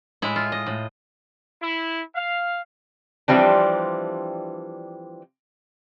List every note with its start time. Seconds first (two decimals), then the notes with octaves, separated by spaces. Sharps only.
0.22 A2 G#3 E4
0.36 F4
0.52 D#5
0.66 A2
1.61 E4
2.15 F5
3.28 E3 F3 G3 C4 D4